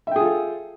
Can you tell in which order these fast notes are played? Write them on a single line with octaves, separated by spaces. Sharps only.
E5 G5 G#4 F4 A4